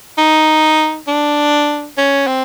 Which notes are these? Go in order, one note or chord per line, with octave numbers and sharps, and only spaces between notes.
D#4
D4
C#4
C4